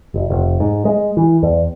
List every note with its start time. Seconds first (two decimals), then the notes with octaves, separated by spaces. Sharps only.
0.14 F#1
0.30 F1
0.60 G#2
0.85 G#3
1.17 E3
1.43 E2